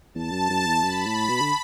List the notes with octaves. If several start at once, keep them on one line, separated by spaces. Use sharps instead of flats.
E2 A5
F#2
F#2
E2
F#2 B5
A2
B2
D3